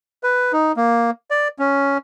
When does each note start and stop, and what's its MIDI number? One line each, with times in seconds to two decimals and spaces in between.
0.23 0.52 71
0.53 0.72 63
0.77 1.11 58
1.31 1.48 74
1.59 1.98 61